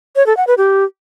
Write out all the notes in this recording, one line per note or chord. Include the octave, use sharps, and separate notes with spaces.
C#5
A4
F#5
B4
G4